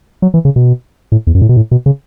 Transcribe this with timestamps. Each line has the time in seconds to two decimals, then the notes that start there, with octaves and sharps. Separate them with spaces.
0.22 F#3
0.34 E3
0.45 C#3
0.56 B2
1.12 A2
1.27 E2
1.35 F#2
1.42 A2
1.49 B2
1.56 A2
1.71 B2
1.86 C#3